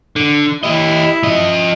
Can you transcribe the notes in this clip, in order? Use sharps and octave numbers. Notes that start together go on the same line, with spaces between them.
D3
E4 G4 D#5
F3 D#5